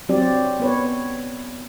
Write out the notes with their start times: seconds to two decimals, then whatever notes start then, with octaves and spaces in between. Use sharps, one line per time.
0.09 F#3 C4 G4 D5
0.60 B3 B4 C#5